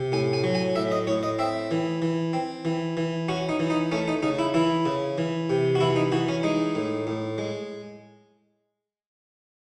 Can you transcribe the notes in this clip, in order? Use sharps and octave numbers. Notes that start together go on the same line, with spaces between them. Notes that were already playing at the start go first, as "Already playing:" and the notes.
Already playing: C3
A2 G#5
G#5
F#3
G#5
A2 E5
D#5
A2 C#5
D#5
C4 E5
E3
E3
C4
E3
E3
C#4 F#4
D#4
E3
D#4
A3 C#4
D#4
C#3 D#4
E4
E3 E4
C#3
E3
C3
F#4
E3 E4
D#4
E3 F#4
C#4
G#3 D#4
A2
A2
G#3